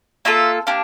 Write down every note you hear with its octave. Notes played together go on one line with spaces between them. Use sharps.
A#3 F4 A4 E5
A#3 D4 G4